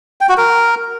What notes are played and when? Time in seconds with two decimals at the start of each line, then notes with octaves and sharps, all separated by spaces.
0.21 G5
0.29 F#4
0.37 A#4